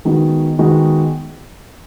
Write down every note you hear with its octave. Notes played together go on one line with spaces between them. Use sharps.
D#3 G#3 B3 D#4 F#4
D#3 G#3 B3 D#4 F#4